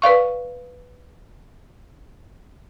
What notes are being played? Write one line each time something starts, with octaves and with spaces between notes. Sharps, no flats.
B4 D5 F5 C#6